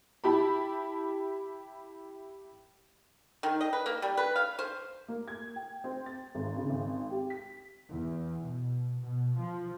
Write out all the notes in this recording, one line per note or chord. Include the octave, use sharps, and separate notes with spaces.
E4 G4 A5 B5
D#3
D#5
B4
A#3
G3
B4
F5
C5
A#3
G#6
G5
C4
A6
G#1
C#3
G#1
G4
B6
E2
B2
B2
F3